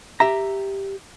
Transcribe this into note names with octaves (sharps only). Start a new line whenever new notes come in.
G4 E5 A#5